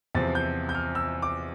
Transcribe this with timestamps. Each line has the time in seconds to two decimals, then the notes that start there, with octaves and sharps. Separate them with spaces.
0.15 E2 C3 F3 C4 A6
0.35 G6
0.69 G6
0.75 F6
0.95 E6
1.22 D6